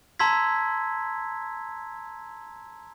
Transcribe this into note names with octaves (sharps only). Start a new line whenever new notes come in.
A5 A#5 C6 E6 G#6 B6